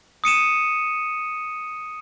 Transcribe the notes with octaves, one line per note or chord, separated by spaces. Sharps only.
D#6 C#7 D#7 E7